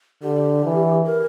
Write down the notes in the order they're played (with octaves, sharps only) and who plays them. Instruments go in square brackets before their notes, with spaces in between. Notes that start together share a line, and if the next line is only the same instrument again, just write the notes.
[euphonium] D3 [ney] G4
[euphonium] E3
[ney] A#4